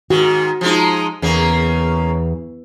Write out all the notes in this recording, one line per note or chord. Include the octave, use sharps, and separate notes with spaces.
G#2 D#3 F#4
F3 G#3 D#4
E2 C#3 A#3